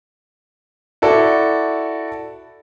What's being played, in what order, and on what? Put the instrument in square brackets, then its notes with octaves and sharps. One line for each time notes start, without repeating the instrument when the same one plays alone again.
[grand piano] E4 F#4 A4 D5